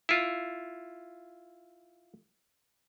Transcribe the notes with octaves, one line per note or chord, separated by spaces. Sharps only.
E4 F4